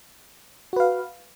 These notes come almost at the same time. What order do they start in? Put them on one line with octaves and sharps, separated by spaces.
F#4 B4 F5